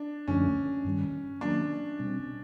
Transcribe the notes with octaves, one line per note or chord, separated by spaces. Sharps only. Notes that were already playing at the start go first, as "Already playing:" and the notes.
Already playing: D4
F#2 D3 F3 A3 C#4 D4
G2 D#3 G3
D#3 F#3 A#3 D4
B2 G3 C4